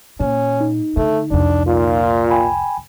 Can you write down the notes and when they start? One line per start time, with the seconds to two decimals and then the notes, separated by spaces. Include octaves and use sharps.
0.20 A#2 C#4
0.61 D#4
0.97 D3 A3
1.31 C2 F2 D4
1.67 A#2 F4
2.31 G5 G#5 B5